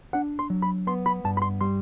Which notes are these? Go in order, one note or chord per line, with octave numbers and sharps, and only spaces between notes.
D4 F#5
C6
F#3
B5
B3 C6
B5
G2 A5
B5
C6
G3 C6